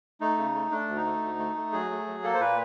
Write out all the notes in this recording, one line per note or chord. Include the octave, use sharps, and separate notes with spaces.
A3 D#4
C#3
A3
A3 D4
D2
D#4
A3
D2
A3
A3
F#3 G#4
A3
F#3
A#3 A4
C5
A#2 B4